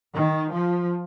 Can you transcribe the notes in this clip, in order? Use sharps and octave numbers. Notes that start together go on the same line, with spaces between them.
D#3
F3